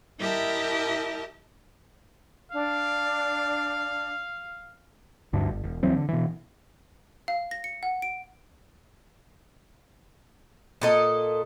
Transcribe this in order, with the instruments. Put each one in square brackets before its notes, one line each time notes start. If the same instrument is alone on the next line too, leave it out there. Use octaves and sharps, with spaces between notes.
[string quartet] E4 G4 A#4 D#5 E5 A5
[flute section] D4 [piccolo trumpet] F5
[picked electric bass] D1 D2 G2 D4
G1
E1
D2 E3 F#3 C4
D3
B2 E3
[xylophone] F5
A#6
C#7
F#5
D7
[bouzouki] A#2 A4 D#5